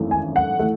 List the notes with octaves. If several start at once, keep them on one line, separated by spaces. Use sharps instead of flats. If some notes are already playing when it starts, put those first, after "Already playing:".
Already playing: G#1 F#2 E3 A3
G#5
F#5
E3 A3